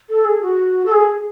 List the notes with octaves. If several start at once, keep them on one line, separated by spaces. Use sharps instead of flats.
A4
G#4
F#4
A4
G#4